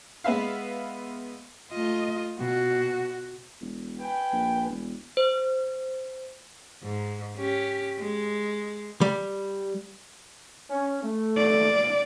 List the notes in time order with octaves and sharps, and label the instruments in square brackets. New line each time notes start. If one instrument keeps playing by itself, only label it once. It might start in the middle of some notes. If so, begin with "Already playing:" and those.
[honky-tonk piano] G#3 B3 B4 E5 F5
[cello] A3 D#5 [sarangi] F4
[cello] B2 [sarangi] F#4
[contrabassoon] E1
[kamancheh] B4 G#5 [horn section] G5
[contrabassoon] A#1
E1
[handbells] C5
[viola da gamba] G#2
C#4 G4
G#3
[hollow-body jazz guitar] G3
[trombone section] C#4
A3
[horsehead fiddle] D5